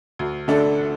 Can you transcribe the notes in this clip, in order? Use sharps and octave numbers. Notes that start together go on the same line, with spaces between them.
D2
D3 A3 D4 A4